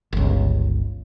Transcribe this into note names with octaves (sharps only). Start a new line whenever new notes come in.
G1 C#2